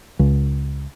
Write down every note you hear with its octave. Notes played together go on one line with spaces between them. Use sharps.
C#2